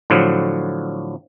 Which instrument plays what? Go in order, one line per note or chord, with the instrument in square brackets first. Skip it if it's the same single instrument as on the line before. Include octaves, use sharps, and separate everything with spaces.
[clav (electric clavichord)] A2 D3 F3 F#3